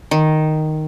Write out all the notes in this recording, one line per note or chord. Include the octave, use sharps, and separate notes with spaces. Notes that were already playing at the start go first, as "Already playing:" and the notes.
D#3